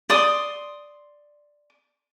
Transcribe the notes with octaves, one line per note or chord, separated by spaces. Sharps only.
D5 C6 D#6